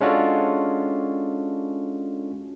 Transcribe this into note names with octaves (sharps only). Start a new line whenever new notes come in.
G#3 C#4 D4 F4 F#4 A4